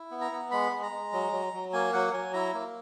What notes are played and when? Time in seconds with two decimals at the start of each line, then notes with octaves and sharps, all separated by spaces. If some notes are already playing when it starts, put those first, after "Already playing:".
Already playing: E4
0.11 B3
0.21 A#5
0.32 B3
0.51 G#3 B5
0.72 G#3
0.83 A#5
0.92 G#3
1.13 F#3
1.32 F#3
1.53 F#3
1.73 A#3 G#5
1.93 F#3 F#5
2.13 F#3 G#5
2.33 E4 A#5
2.54 A#3